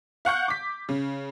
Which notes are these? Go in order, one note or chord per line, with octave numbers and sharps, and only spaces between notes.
F5 F#5 C#6 G6
D6 B6
C#3